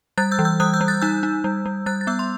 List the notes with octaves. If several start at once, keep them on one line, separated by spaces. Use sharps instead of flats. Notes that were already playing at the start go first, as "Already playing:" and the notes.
G3 F#6 A6
E6 G6
E3
E6 G6
G3 D#6 F#6
E6 G6
G3
F#6 A6
D#4 E6 G6
D#4
G3
G3
G3 F#6 A6
A6
B3 E6 G6
C6